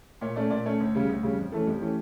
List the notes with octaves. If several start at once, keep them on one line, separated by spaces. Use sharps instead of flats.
A#2 C#5
A3 C#4 D5
A#2 D5
A3 C#4 C#5
D2
C#3 G3 C#4
D2
C#3 G3 C#4
F2
E3 A3 C#4 A4
F2 G4
E3 A3 C#4